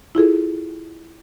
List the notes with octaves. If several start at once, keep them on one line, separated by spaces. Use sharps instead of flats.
E4 F4 G#4 A4